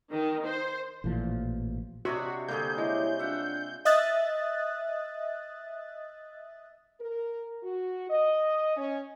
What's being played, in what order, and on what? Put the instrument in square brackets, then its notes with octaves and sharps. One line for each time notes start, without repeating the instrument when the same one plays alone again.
[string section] D#3
C5
[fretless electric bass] A1 A#2 E3 F3
[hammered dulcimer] C3 C#5 C6 [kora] D4 D#5 E5 [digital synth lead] F#4
[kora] D3 A#3 [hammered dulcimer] G3 G4 G#4 [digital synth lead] G6
[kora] G#3 [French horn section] E4 C#5
[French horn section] D4 F4 [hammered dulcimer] E5 F#5
[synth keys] D#5 E5 D#6 F#6 A6
[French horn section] A#4
F#4
D#5
C#4